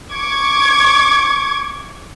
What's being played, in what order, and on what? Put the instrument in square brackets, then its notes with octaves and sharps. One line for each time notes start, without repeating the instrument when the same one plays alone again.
[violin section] C#6 D6 G#6